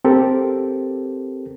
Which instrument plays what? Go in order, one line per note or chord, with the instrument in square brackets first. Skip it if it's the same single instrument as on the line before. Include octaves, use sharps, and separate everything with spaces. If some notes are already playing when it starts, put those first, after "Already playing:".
[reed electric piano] C4 G4 A4 A#4